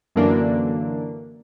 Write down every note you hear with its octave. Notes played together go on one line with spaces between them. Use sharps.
F#2 D3 E3 F#3 A#3 D4